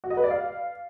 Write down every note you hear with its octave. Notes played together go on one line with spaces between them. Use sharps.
F#4
D#5
B4
D5
F5